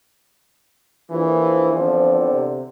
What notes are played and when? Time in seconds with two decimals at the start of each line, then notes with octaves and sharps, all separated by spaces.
1.10 A#1 E3
1.73 E2 D3 F3 C4
2.32 C3